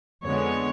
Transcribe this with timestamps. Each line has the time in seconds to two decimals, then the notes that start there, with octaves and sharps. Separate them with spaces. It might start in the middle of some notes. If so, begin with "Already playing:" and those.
0.25 F2 D3 G#3 B3 C#5